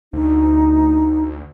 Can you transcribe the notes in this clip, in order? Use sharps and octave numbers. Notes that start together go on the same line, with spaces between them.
D2 D#4